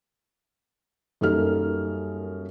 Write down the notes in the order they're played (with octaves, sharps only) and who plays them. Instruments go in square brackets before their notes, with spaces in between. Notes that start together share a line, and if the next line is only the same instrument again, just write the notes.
[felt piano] F#2 G3 A#3 D#4 A4 F6